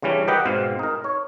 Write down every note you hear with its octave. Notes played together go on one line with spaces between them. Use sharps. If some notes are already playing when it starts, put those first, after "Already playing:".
C#3 E3 G3 C#4 D4
G4 A#4 B4 D#5 F#5 G5
G#2 B2 C4 F5
D#4 A#4
C#5